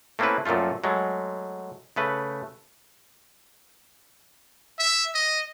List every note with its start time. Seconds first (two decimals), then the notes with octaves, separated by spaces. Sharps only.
0.19 A3 A#3 C4 C#4 E4 B4
0.46 F#2 A#2 F3 A3 F4
0.84 F#3 G#3 A3
1.96 C#3 A3 B4
4.79 E5
5.14 D#5